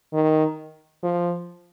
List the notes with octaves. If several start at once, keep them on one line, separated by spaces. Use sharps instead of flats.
D#3
F3